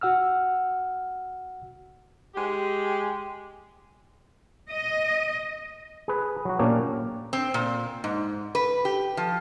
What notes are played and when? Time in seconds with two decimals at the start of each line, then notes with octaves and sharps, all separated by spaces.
0.01 F#4 F#5 E6 F6
2.35 G#3 G4
4.70 D#5
6.08 G#4 B4
6.45 F#3 F#4
6.59 A#2 A#3 C#4 D4 G4 A#4
7.33 C4
7.54 A#2
8.04 G#2
8.55 B4
8.85 G4
9.17 F3